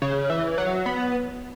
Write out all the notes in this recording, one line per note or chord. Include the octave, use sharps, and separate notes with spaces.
C#3
E3
F#3
B3